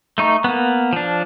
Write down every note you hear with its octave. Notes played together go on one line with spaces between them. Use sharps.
A3 D#4 C#6
A#3 B3
F3 D4